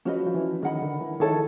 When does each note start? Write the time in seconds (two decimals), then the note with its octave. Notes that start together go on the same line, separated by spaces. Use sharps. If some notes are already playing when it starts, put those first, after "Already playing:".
0.05 F3 C#4 F#4 B4 D#5
0.27 F3
0.34 E3
0.62 D#3 A#4 D#5 F#5 B5
0.82 D3
1.01 E3
1.20 D#3 E4 A4 C#5